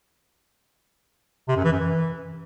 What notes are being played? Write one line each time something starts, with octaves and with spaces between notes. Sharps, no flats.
C3
F#2
E3
F#2
E3